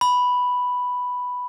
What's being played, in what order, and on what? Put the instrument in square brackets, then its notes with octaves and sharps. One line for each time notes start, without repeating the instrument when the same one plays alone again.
[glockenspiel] B5